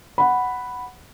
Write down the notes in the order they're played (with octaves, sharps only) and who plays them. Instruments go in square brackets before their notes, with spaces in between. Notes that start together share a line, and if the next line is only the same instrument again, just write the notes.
[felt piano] F#5 B5